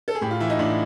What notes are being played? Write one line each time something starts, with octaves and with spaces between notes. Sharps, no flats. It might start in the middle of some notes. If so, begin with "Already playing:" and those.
A4
G#4
A2 G4
F4
E3 E4
D#4
A2 D4